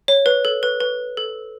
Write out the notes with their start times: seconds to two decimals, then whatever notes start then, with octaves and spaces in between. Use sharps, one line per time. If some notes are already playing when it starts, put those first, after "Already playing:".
0.08 C#5
0.26 B4
0.45 A4
0.63 B4
0.80 B4
1.17 A4